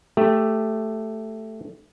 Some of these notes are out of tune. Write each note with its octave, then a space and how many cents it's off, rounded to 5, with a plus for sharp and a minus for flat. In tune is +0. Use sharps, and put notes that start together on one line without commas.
A3 +0 G4 +5